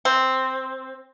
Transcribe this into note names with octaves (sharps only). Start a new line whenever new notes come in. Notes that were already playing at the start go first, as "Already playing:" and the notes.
C4